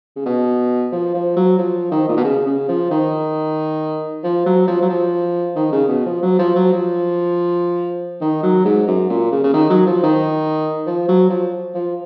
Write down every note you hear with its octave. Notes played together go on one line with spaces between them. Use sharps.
C#3
B2
F3
F3
F#3
F3
D#3
A#2
B2
C#3
C#3
F3
D#3
F3
F#3
F3
F#3
F3
D#3
C#3
B2
F3
F#3
F3
F#3
F3
D#3
F#3
G#2
F#2
A#2
C#3
C#3
D#3
F#3
F3
D#3
F3
F#3
F3
F3